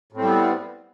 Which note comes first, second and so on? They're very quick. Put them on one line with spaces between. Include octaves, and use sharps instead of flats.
A2 C4 G3 B3